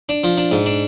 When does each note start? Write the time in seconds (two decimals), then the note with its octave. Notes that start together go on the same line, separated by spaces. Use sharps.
0.09 D4
0.24 F3
0.38 D4
0.52 G#2
0.66 D4